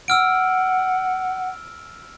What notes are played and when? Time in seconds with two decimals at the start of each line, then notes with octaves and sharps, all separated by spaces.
0.08 F#5 E6 F6 D7